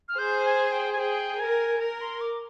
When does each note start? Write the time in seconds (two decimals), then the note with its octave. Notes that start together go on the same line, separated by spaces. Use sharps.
0.08 F6
0.18 G#4 C5 G6
0.45 G#5
0.72 G5
0.93 G#5
0.99 G#4 G5
1.39 A#4 G#5
1.80 A#4 A#5
2.01 C6
2.21 D6